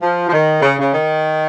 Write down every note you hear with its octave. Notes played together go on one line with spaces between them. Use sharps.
F3
F3
D#3
C#3
C#3
D#3